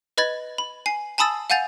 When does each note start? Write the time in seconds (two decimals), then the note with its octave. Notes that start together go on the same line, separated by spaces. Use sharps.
0.18 B4 D#5 B5 G#6 A6
0.58 B5
0.86 G#5 C7
1.18 G#5 A5 B5 D#6 E6 A6
1.50 F5 F#5 G#5 G6 A6 F7